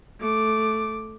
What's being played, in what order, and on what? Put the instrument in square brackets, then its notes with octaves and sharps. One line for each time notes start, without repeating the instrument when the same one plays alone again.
[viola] A3 D6